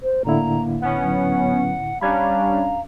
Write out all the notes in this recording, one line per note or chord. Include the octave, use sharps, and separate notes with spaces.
C5
A2 D3 A#3 E4 A#5
B3 C#4 F#5
F#3
G3 C#4 D4 F5 A#5 B5 G#6